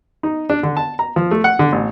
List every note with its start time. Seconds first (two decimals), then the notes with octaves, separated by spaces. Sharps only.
0.23 D#4
0.50 D4
0.63 D3
0.77 A5
0.99 A#5
1.16 F3
1.31 A3
1.44 F#5
1.59 D3
1.72 A1